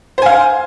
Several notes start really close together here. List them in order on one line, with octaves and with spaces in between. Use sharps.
C5 G#5 F5